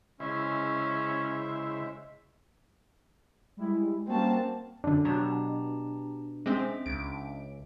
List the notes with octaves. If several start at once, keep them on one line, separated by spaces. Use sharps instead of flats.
C#3 G#3 C#4 E4 C5 E5
G3 G#3 E4
G3 A#3 C4 C#4 F#4 A5
F#2 D3 D4
B2 F#3 G4 A5 A#5
G#3 C4 C#4 E5 D6
C#2 D7